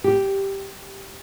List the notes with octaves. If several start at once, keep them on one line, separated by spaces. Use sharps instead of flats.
G4